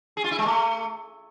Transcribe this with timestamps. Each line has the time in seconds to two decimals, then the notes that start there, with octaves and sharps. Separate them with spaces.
0.17 G#4
0.24 F4
0.31 E4
0.38 G#3
0.46 A3